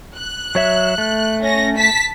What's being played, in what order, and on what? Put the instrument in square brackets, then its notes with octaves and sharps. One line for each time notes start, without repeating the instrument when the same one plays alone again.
[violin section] F#6
[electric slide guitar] F#3 C#5 E5
A3
[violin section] C#4 A#6
A5 B6